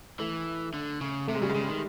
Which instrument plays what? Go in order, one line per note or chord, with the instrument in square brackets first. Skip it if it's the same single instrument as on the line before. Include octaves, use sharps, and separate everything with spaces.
[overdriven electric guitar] E3 [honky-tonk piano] A3
[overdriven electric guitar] D3
C#3
[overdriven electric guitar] C3 [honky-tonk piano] A3
[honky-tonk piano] G#3
[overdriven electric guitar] C#3 [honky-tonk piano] G3
[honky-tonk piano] G#3
[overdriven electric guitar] C#3
D#3